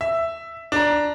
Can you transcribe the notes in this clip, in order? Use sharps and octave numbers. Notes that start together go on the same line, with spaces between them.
E5
D4 A#5